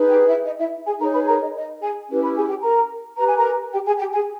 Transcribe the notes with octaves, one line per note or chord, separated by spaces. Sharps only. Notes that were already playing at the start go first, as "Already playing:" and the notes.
Already playing: D#4 G#4 B4
G4 G5
E4 E5
D#5
E4 E5
G#4 G#5
D#4 G#4 A#4 C#5 A#5
B4 B5
A#4 A#5
D#5
D#5
G#4 G#5
C#4 E4 G4 B4
B4 B5
G#4 G#5
G4 G5
A#4 A#5
G4 B4 A#5
G#5
A#4 A#5
G4 G5
G#4 G#5
G4 G5
G#4 G#5